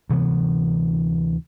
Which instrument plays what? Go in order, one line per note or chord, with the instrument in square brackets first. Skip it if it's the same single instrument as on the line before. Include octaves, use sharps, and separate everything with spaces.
[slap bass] D2 C3 E3 B3